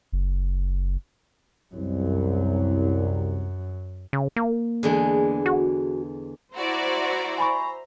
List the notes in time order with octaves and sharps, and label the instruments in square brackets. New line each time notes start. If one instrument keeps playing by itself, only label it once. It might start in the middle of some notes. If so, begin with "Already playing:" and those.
[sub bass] F#1
[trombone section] C2 [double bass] F#2 F#3
[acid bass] C#3
A#3
[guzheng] E2 D3 G#3
[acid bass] F#4
[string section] E4 F#4 D5 [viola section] C5 E5 A#5
[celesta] G#5 B5 C#6